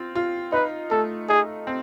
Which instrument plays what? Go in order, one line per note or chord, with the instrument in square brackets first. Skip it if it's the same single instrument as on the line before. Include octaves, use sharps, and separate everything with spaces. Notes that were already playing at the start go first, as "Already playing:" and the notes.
Already playing: [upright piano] C4 F4
F4
[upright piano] D#4 [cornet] B4
[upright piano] A3 [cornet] A4
[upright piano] D#4 [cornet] G#4
[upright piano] C4